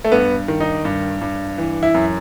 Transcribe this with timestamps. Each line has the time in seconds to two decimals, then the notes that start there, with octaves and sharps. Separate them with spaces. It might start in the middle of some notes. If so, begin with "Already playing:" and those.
0.04 A3
0.12 G2 B3
0.48 D#3
0.60 D#4
0.85 G2
1.21 G2
1.58 E3
1.83 E4
1.94 F#2